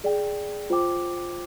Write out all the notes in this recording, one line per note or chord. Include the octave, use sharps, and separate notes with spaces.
G#4 D5 G5
F4 C5 G5 D6